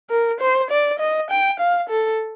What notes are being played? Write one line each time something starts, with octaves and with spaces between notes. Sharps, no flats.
A#4
C5
D5
D#5
G5
F5
A4